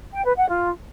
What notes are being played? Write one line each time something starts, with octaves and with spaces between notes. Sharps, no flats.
G5
B4
F#5
F4